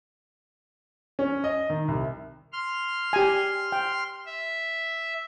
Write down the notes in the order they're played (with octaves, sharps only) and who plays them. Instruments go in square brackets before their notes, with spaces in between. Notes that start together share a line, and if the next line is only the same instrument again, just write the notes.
[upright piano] C#4
D#5
D#3
C2
[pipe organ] C6 F6
[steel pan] G4 G#5
G5
[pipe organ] E5